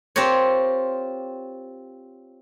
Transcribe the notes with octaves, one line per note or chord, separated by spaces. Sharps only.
C4 F4 G4 A#4 C#5